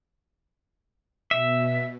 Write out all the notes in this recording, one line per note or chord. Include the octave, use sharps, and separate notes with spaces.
B2 E5